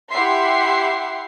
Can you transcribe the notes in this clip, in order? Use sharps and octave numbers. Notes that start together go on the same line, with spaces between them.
E4 G4 E5 F#5 C6 C7